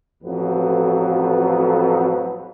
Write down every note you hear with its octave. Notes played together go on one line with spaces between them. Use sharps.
A1 F2 F#3 B3 B4